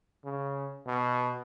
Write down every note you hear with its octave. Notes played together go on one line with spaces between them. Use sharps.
C#3
B2